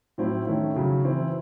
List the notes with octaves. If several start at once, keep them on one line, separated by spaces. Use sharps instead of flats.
A2 F#3 C4 E4
D#3 A3 C#4 E4
C#3 F#3 C#4
E3 C4 E4